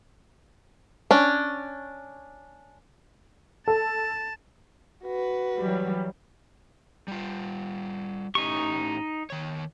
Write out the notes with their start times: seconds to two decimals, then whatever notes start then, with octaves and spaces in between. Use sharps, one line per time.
1.11 C#4 D4
3.68 A4 A5
5.04 F#4 B4
5.59 E3 F#3 G3
7.08 G3 F4
8.35 A2 C#4 D#4 G4 C#6
9.30 D#3 C#5